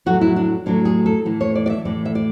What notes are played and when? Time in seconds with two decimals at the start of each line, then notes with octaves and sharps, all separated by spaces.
0.06 A2 F#3 A3 F#4
0.21 E4
0.36 D4
0.66 A2 F#3 A3 D4
0.85 G#4
1.06 A4
1.25 A2 E3 A3
1.41 C#5
1.55 D5
1.66 D5
1.70 E5
1.85 A2 E3 A3 D5
2.05 E5
2.15 D5